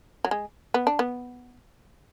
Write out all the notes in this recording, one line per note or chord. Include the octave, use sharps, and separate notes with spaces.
F#3
G#3
B3
D4
B3